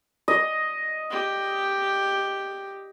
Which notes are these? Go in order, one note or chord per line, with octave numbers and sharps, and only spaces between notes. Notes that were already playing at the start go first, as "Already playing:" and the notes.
D#5
G4